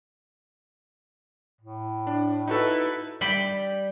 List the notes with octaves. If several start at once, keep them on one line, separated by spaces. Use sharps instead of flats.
A2
D4
D#4 E4 F#4 A4 B4
G3 G5 B5